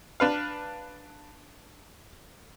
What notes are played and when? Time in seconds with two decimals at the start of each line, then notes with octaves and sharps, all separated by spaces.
0.20 D4 B4 F5